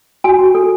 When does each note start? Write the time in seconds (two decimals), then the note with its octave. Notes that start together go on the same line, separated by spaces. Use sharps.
0.24 F#4 G#5
0.39 F#4
0.55 A4